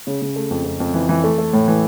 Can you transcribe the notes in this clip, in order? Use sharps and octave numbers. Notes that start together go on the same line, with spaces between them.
C#3
C#3
A3
F2
F2
F2
E3
E3
A3
A3
A2
E3